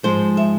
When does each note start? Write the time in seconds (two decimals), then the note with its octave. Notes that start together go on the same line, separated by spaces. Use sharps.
0.03 G#2 F3 G#3 C5
0.37 E5